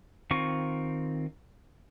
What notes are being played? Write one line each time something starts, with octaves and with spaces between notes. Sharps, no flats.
D#3 C4 F4 C#6